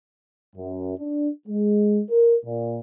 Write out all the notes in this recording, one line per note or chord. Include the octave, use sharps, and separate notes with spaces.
F#2
D4
G#3
A#4
A#2